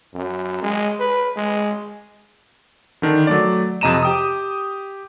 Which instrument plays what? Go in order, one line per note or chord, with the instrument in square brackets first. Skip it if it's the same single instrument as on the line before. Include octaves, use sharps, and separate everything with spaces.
[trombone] F#2
G#3
B4
G#3
[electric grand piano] D3 D#3 D4
F#3 A3 D5
F2 C3 D#5 A#5 D#7 E7
G4 G5 D#6